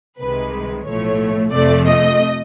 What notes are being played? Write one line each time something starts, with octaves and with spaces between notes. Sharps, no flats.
C2 C3 D#3 G#3 B4
B1 A2 F3 A3 C#5
F2 C3 F3 A3 D5
D#5